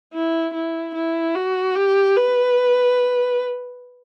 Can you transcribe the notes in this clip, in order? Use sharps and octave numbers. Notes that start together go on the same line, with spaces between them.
E4
E4
E4
F#4
G4
B4